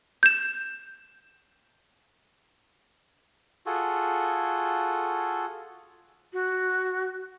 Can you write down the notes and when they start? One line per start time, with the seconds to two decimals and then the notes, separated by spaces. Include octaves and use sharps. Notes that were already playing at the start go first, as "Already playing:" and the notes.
0.23 G6 E7
3.66 F4 F#4 G#4 A4
6.33 F#4